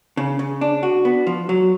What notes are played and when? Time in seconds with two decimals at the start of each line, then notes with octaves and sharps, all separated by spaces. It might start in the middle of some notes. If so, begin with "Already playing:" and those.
0.17 C#3
0.39 C#3
0.61 D4
0.83 F#4
1.05 B3
1.27 F3
1.49 F#3